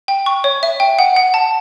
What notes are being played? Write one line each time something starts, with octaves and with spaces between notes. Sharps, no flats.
G5
C#6
C#5
E5
G5
F#5
F#5
A5